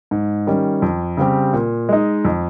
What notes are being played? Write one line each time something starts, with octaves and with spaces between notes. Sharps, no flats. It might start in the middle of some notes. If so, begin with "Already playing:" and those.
G#2
D#3 G3 C#4
F2
C#3 G3 C4 G4
A#2
G#3 D#4
F2